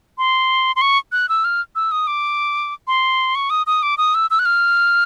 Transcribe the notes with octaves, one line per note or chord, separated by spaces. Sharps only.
C6
C6
C#6
F#6
E6
F6
E6
D#6
D6
C6
C#6
D#6
D#6
D6
D#6
E6
E6
F#6
F6